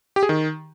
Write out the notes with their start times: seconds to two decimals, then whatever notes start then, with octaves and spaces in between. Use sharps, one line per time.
0.16 G4
0.23 G#4
0.29 D#3